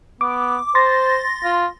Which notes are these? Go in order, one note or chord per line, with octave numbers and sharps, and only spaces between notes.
B3 D6
C5 C6 A6 A#6
F4